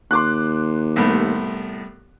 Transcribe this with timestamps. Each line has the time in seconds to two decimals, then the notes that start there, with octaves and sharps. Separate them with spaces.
0.11 D#2 C6 D6 F#6
0.96 C2 A2 B3